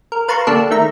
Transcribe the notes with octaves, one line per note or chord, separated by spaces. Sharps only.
A#4
B4 F5 A5 A#5 C6 C#6
D3 A#3 D4 G4 A4
D#3 A3 E5 A#5